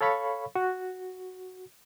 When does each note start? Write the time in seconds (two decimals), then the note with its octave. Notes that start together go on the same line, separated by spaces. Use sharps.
0.01 A4 C#5 F5 B5 C#6
0.55 F#4